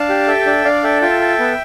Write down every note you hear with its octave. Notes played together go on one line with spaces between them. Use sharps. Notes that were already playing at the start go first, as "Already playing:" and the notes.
Already playing: D4 F5 A5
G4
A4 E5 G5
D4
D4 D5 F5
A4 E5 G5
F4 E5 G5
A4
B3